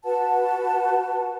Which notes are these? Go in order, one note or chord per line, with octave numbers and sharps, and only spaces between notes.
F#4 B4 F#5 A5